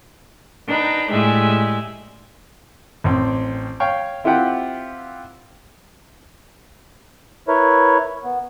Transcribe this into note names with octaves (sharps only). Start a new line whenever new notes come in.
D4 D#4 B4 G5 A#5
A2 G#3 G4 D5 E5 G#5
A1 C4
C#5 F5 G5 C#6
C4 E4 F4 G4 F#5 G5
E4 A#4 B4 C#5
B3